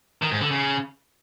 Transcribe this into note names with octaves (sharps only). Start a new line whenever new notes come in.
D#3
G#2
D3
C#3